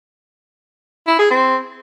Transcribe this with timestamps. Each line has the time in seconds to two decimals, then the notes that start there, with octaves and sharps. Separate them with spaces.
1.07 E4
1.19 G#4
1.31 C4